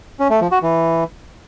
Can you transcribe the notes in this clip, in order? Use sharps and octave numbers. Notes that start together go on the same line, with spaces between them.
C#4
A3
F3
F#4
E3